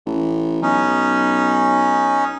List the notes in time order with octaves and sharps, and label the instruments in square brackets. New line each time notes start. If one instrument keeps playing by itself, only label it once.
[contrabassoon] A1
[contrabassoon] B1 [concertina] C#4 D#4